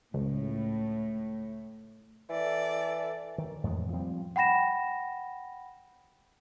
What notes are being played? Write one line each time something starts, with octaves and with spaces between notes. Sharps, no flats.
C#2 A2
E3 A4 D5
D#3
F2 A2 E3 G#3
F3 G3 C4
F#5 G5 B5 A#6 E7